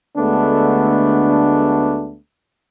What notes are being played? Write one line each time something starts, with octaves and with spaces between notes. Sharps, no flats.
D2 D3 G#3 A3 B3 D4